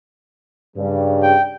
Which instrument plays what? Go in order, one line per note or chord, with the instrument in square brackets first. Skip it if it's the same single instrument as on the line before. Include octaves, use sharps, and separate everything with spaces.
[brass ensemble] G2 C#3 G3
[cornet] G5